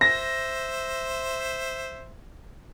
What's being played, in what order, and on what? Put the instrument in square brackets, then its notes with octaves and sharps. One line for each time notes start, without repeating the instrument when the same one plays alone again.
[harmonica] C5 E5 [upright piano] A#6